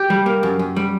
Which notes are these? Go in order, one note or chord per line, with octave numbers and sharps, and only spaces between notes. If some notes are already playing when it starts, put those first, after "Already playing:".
Already playing: G4
G3
A#3
F#2
F#2
G3